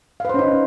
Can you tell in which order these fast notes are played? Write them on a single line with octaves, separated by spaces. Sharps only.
F5 B4 C5 C#4 D#4